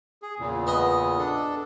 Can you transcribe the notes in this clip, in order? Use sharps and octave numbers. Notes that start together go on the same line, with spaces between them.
G#4
E2 A#2 C#3
B3 D#5
D4 A4